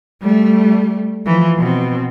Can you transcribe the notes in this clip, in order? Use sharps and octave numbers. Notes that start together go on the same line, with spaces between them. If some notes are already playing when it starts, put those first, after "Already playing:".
G3 A3
E3 F3
B2 C4